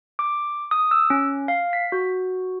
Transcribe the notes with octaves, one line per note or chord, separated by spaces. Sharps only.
D6
D#6
E6
C#4
F5
B6
F#4